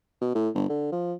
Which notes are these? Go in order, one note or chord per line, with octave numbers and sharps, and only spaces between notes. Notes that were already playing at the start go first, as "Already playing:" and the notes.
B2
A2
G1
D3
F3